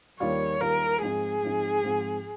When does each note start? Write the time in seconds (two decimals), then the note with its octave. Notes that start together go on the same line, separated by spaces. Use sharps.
0.20 D#2 D#3 G3 A#3 F4 C#5
0.61 D#2 D#3 G3 A#3 F4 A#4
1.02 G#2 F3 C4 D#4 G#4
1.43 G#2 F3 C4 D#4
1.83 G#2 F3 C4